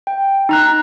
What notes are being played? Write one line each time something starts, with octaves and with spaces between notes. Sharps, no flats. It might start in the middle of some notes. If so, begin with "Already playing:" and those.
G5
D#4 A#5 F#6